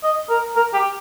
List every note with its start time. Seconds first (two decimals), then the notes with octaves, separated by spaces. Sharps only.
0.03 D#5
0.30 A#4
0.56 A#4
0.74 G4